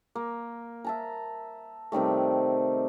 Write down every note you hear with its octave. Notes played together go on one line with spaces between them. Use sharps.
A#3
E5 A5 A#5
C3 D#3 G3 A3